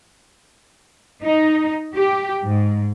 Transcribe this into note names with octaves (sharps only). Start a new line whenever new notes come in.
D#4
G4
G#2